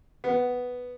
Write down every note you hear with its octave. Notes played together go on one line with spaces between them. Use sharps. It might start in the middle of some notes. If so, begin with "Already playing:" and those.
B3